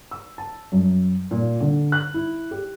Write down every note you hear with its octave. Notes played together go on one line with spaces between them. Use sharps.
E6
A5
F#2
A#2
D3
F#6
E4
G4